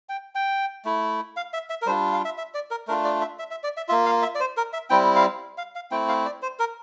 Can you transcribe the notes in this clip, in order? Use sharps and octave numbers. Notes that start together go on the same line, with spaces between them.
G5
G5
A3 E4
F5
E5
E5
A#4
G3 D4 F4 C5
F5
E5
E5
D5
A#4
A3 D4 F4 A#4
D5
E5
E5
E5
D5
E5
A#3 F4 E5
F5
E5
D5
C5
A#4
E5
G3 C4 E4 G5
F5
F5
F5
A3 C4 E4 G5
F5
D5
C5
A#4